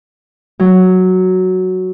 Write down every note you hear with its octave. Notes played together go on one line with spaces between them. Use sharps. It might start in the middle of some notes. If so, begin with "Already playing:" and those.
F#3